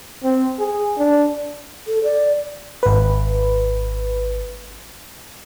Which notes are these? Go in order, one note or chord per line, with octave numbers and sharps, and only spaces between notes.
C4
G#4
D4
A4
D5
G#1 B4